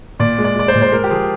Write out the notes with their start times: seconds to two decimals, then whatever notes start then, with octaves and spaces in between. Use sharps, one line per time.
0.20 A#2 D5
0.38 G#3
0.44 D5
0.56 G#3 D5
0.68 C5
0.75 A#2
0.82 C5
0.92 G#3 A#4
1.04 G4
1.11 F3 G#4